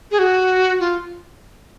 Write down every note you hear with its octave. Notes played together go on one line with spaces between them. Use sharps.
G#4
F#4
F4